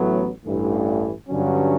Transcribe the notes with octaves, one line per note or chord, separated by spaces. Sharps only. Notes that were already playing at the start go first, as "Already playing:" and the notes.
Already playing: A1 A2 F#3 B3
A1 G2 E3 A3
G2 D3 F#3 C#4